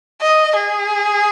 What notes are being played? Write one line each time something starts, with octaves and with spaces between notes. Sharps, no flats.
D#5
G#4